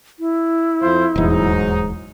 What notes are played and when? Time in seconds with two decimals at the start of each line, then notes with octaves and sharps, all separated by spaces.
0.19 E4
0.81 F2 F4 C5
1.16 D#1 E2 G#2 F#3 D#4